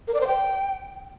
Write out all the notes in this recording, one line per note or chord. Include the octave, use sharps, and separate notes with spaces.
A#4
D5
C5
G5